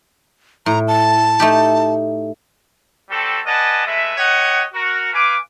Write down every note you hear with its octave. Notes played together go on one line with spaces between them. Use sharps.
A2 A#5
A5
A3 D#4 G4
G3 C4 F#4 A4
B4 D5 D#5 F#5 G#5 A5
G#3 A3 B4 E5
G4 C#5 D#5 F#5
F#4 A#4
B4 F5 G#5 D6